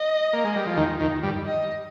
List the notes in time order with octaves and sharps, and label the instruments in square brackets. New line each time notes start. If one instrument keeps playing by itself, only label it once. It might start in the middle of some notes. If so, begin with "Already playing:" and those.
Already playing: [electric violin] D#5
[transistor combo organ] A#3
G#3
G3
F3
D#2 D#3
D#2 D#3
G2 G3
[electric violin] D#5